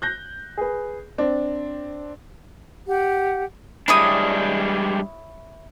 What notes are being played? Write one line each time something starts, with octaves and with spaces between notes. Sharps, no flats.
F#6 G6 A#6
G#4 B4
C4 D4
G4 F#5
G3 G#3 D4 E4 C#5 D#6